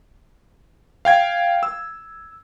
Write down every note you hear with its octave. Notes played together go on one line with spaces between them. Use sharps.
F5 G5 G#6
E6